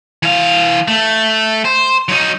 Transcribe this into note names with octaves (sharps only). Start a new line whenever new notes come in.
E3 F5
A3
C5
F#3 D#4